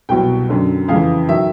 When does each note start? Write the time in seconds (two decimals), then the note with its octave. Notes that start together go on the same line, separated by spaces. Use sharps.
0.09 C2 B2 F#3 G5
0.49 F#2 D3 F#3
0.88 F2 C#3 E3 F5
1.28 D#3 F#3 E5